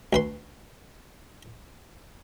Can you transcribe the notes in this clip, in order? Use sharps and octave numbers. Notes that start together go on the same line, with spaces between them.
D2 B4 C6